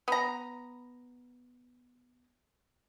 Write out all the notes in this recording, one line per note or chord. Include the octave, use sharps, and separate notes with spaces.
B3 A#5